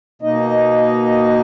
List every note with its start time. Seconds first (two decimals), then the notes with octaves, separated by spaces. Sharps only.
0.22 B2 A#3 D#4 D#5